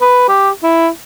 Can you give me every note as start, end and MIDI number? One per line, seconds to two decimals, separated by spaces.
0.01 0.24 71
0.29 0.50 67
0.63 0.88 64